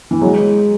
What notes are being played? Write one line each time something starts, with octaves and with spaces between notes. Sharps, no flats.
E3
F#3 G#3